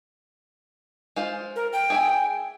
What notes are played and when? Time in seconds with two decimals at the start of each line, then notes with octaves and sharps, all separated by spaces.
1.16 G#3 F4 C5
1.56 A#4
1.73 G5
1.90 G#4 E5 G#5